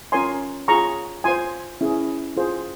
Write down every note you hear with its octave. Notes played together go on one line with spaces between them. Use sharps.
C#4 F4 A#4 C#5 G#5 C6
F4 G#4 C#5 A#5 C#6
F4 C5 G#5 C6
C#4 E4 G#4
F4 G#4 C5